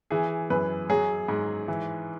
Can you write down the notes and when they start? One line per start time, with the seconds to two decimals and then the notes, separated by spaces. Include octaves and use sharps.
0.10 E3 G#4
0.50 F#2 B4
0.89 F#3 G#4
1.28 G#2
1.68 E3